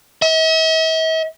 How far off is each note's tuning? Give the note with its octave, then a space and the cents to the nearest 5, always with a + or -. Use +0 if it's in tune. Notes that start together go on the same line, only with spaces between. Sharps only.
E5 -45